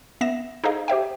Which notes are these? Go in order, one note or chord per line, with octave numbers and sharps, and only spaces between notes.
B3 E5 A#6 E7
D#4 G#4 A4 C5 D#5 F5
G4 C5 E5 G5